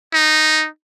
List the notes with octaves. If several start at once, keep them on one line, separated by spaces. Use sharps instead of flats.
D#4